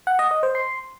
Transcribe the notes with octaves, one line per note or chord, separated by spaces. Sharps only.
F#5
D#5
D#5
C5
C6